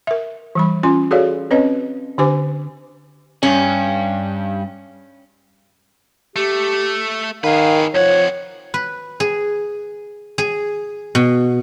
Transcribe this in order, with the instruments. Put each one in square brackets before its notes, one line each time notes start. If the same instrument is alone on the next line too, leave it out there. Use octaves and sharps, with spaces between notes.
[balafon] A#4 E5
E3 G3 B5
C#4 F4 G#5 C6
F#4 G#4 A4 C#5 D5 F5
C4 C#4 B4 C#5 D#5
D3 D4 G4 C5 G#5 D6
[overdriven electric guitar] G2 [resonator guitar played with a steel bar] C#4
[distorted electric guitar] A3 [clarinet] G4
[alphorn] D#3 [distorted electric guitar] G#4 B4 [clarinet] F5
[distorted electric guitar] F2 F#5 [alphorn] F3 [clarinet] C#5
[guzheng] B4
G#4
G#4
B2